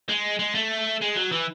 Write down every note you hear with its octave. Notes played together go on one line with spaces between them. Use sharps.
G#3
G#3
A3
G#3
F#3
E3